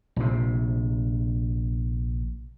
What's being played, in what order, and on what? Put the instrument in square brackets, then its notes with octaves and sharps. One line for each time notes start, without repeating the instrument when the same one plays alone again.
[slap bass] A#1 C3